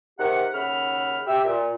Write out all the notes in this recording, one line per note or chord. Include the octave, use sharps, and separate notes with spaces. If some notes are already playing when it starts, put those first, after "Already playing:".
C3 D#3 G4 A#4 F#5
D#2 C#3 E5 F#5 B5 F6
G4 E5
A#2